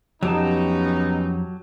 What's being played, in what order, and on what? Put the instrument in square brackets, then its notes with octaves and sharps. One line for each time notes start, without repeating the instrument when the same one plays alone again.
[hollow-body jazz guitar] F2 [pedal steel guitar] F#3 G4 A5 [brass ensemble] B3 C#4 D#4